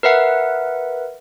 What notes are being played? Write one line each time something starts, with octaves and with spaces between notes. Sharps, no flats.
A#4 B4 E5 F#5